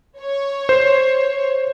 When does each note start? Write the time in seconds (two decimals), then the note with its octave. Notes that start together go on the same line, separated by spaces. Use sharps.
0.19 C#5
0.69 C5